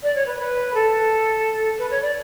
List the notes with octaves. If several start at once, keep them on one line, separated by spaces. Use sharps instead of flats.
D5
C#5
B4
B4
A4
B4
C#5
D5